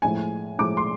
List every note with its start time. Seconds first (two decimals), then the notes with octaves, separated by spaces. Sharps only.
0.02 A2 F3 G#3 G#5
0.58 A2 F3 G#3 D6
0.77 C6